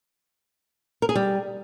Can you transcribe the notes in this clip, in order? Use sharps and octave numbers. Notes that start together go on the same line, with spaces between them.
A#4
G#4
G3